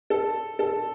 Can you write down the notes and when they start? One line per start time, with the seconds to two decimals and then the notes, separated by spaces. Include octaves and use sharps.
0.10 A4
0.59 A4